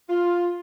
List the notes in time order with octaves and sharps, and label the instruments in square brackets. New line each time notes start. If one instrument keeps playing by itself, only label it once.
[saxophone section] F4